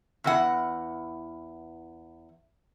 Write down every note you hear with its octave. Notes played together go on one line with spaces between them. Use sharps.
E2 E3 F#5